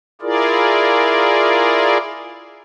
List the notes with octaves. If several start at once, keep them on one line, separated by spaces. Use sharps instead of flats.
E4 F4 G#4 A#4 D5